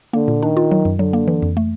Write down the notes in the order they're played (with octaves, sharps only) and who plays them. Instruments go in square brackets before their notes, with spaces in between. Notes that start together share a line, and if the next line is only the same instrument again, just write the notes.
[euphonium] D3 [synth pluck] A#3
[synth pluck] A#2
[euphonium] D#3 [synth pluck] D4
[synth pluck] F4
F#3
F#2
[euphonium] D3 [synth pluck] F#3
[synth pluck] A#3
E3
F2
A3